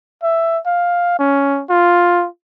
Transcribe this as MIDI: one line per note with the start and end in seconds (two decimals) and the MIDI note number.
0.23 0.58 76
0.66 1.16 77
1.19 1.63 61
1.70 2.27 65